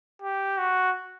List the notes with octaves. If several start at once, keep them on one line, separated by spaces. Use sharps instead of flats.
G4
F#4